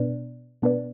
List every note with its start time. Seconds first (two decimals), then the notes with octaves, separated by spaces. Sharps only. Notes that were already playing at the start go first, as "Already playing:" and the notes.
Already playing: B2 B3 D4 B4 D5
0.62 B2 B3 D4 B4 D5